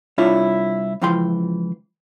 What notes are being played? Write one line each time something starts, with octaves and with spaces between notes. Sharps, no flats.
C2 D4 E4 F4 C#5
C#2 E3 F3 G5 C6